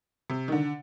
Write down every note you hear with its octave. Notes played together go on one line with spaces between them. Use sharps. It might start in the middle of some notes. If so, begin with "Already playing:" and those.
C3
D#3
D3